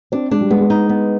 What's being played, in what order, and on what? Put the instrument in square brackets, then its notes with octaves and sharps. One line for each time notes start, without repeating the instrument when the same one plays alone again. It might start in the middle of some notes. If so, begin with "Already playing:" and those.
[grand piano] C4 [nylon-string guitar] D4
[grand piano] G#3 [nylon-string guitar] D4
[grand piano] G3
[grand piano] G#3 [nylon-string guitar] B3
[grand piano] G#3
[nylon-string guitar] D#4
B3